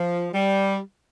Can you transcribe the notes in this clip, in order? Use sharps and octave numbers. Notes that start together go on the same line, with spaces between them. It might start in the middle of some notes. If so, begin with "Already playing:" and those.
Already playing: F3
G3